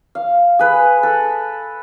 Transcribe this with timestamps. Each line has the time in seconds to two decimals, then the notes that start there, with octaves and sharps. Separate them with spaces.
0.15 F5
0.59 G#4 B4
1.03 A4